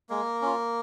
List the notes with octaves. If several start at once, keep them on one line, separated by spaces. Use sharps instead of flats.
G#3 A#3 A#4
C#4 F4